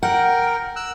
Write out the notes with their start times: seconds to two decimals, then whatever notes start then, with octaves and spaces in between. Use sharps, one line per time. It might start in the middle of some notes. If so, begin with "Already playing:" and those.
0.03 A#4 F#5 G5
0.76 E6 F#6